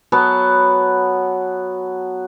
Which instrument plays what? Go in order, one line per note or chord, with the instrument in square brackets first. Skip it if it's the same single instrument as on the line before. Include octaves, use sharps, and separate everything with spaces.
[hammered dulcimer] F#3 B3 A5